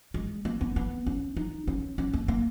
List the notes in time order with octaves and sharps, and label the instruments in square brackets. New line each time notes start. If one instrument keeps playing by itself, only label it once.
[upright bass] G#3
A#3
B3
B3
C#4
D#4
C#4
C#4
A#3
A#3